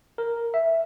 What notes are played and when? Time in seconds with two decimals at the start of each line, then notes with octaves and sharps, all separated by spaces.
0.18 A#4
0.54 E5